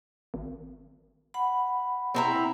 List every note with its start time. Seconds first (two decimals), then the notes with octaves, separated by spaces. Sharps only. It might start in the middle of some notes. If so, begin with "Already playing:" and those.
0.34 G#1
1.34 F#5 B5
2.15 C4 E4 A#5